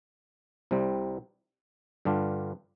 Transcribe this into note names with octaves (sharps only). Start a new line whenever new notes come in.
C2 C3 G3 C4
G2 D3 G3 D4 F4